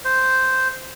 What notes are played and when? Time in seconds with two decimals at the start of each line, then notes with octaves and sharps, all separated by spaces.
0.05 C5